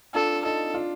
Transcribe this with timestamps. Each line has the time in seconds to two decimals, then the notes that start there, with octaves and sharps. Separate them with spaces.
0.14 D4 F4 A4
0.45 D#4 A4
0.74 D4 F4